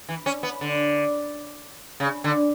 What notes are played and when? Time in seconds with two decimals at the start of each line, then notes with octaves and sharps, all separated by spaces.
0.09 E3
0.26 C#4
0.43 B3
0.61 D3
2.00 C#3
2.24 D3